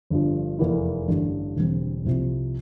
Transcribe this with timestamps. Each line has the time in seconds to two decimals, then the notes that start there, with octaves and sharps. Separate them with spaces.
0.10 G1 G2 F3
0.59 F1 E2 E3 A#3 E4
1.08 A1 G2 D3
1.56 E1 E2 D3 G3 C4
2.05 C2 C3 F3 C4